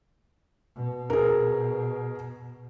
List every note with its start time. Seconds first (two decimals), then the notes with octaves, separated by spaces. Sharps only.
0.76 B2
1.10 G#4 A#4